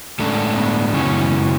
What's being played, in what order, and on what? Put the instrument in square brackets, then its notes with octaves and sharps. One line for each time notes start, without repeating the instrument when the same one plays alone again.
[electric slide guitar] A2 G#3 D4 A4 [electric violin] C#4
[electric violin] B3
[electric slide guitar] F#2 C#3 G#3 B3 E4 [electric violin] C#4